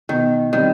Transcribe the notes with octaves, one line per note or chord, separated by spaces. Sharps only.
B2 D#3
D#3 G3 C4